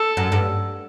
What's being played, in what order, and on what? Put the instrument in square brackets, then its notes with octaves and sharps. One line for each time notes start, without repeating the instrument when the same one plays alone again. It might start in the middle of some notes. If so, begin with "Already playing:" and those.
Already playing: [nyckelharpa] A4
[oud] F#2
G2